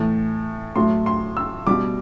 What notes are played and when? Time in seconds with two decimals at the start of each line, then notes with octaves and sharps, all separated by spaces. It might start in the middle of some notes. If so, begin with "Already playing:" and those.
Already playing: A2 E3 A3
0.76 A2 F#3 A3 C6
1.06 C6
1.37 E6
1.67 B2 G3 D6